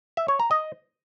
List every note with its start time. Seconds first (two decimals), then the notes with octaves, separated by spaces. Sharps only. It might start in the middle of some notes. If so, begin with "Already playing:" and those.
0.17 E5
0.28 C#5
0.40 A#5
0.51 D#5